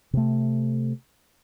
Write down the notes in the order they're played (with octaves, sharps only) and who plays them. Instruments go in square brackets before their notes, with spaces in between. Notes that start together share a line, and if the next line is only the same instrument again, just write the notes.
[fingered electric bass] C3 A3